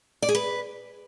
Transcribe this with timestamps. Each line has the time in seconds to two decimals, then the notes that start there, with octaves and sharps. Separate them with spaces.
0.22 D5
0.29 G#4
0.35 B4